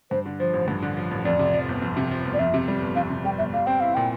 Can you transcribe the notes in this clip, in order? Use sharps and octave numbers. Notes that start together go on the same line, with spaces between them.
G2 C5
D3
F3 C5
A1
G2
D3
F3
A1
F2 D5
C3
F3
G1
F2
C3
F3
G1
D5
F2 E5
C3
G3
G1
F2 F5
C3
G3 G5
G1 E5
G3 F5
C4 G5
E4 F5
A#2 G5